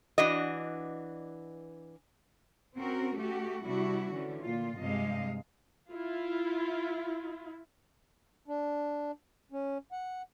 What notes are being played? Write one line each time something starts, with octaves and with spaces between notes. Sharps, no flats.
E3 D4 F#4 D#5
C4 C#4 F#4 A#4
A3 F#4 G4
C3 G3 D4 E4 F#4
D3 E3 A3 C#4
A#2 F4
G2 C3 G#3 D#5 F5
E4 F4
D4
C#4
F#5